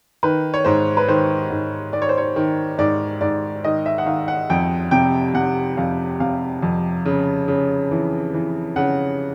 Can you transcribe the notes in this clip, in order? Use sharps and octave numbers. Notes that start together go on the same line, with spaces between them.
D#3 B4
C#5
G#2 C5
B4
D#3 C5
G#2
D#3 D5
C#5
C5
C#5
D#3
G#2 D5
G#2 D5
D#3 D#5
E5
F#5
D#3 F5
F#5
F2 G5
C3 G5
C3 F#5
F2 F5
C3 F5
F2
C#3
C#3
E3
E3
C#3 F#5